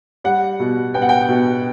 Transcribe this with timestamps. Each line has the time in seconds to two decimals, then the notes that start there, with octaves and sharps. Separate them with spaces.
0.24 G3 F#5
0.60 B2
0.94 B3 G5
1.02 F#5
1.09 G5
1.29 B2